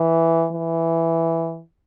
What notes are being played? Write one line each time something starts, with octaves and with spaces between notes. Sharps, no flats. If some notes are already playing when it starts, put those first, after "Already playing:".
Already playing: E3
E3